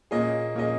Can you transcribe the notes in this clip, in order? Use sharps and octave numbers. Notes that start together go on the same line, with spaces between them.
A#2 A#3 C#4 G#4 D#5
A#2 A#3 C#4 G#4 D#5